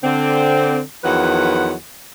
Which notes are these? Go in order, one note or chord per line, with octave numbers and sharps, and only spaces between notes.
D3 C4
E2 D#3 F3 F#3 B4 F#5